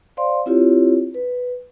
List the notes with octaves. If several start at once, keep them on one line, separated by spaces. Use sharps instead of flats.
C5 D5 F5 C6
C4 E4 F4 G4 C#5
B4